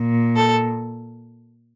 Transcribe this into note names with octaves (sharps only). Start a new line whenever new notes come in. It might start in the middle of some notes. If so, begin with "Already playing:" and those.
Already playing: A#2
A4